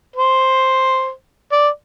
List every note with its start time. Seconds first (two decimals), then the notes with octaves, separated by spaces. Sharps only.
0.16 C5
1.52 D5